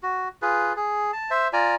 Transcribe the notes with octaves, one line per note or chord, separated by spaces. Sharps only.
F#4
F4 G#4 B4
G#4
A5
C5 E5
F4 D5 G#5 A#5